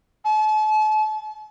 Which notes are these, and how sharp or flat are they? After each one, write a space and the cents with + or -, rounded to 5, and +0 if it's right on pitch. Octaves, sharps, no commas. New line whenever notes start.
A5 -40